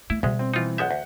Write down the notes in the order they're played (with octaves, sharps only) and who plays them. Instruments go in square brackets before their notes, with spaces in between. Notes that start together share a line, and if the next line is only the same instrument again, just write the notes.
[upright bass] A3 [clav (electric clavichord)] E4
[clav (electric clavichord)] D2 G#3 [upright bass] B2 G3
[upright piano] C4
[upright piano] E3 C4 [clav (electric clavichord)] D#4 F4
[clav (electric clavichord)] B1 G#3 E5 [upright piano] F#5 G6
[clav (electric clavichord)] D2